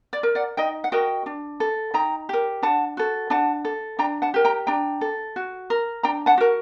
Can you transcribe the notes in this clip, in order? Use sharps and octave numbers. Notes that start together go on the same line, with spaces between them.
D5
A#4
D5 F#5
D#4 D#5 G5
F#5
F#4 A#4 D#5 G5
D4
A4
D#4 G5 A#5
G4 A#4
D4 F#5 A5
F#4 A4
D4 F#5 A5
A4
D4 G5 A#5
F#5 A5
G4 A#4
G5 A#5
D4 G5 A#5
A4
F#4
A#4
D4 G5 A#5
F#5 A5
F#4 A#4